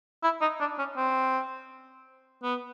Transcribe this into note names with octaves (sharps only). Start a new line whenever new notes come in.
E4
D#4
D4
C#4
C4
B3